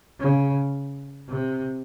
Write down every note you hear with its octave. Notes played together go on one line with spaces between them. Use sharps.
C#3
C3